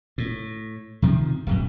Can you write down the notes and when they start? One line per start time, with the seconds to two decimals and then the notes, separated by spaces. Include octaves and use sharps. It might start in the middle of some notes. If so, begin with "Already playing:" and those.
0.18 A2
1.02 C3 D#3 F3
1.47 D1 F#2 B2